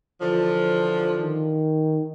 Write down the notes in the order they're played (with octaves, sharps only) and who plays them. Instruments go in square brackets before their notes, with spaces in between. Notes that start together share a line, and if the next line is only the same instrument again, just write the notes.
[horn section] D3 E3 F3
[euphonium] D#3